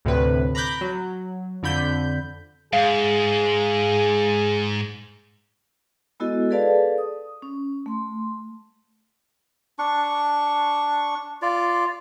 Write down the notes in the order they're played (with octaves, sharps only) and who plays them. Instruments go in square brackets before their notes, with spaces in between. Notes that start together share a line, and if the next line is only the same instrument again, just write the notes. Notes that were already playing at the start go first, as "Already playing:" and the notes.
[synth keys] D2 A2 C3 B4
A#5 B5 D6 F#6 G6
F#3
F2 D3 B5 G6
[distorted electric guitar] G#2 [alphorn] G#4 [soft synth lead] F5
[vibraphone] G#3 B3 E4 F#4 A4 D#5
G#4 A4 B4 D5 F5 A5
D#6
C#4
A3 C6
[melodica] D4 C#6
F4 D5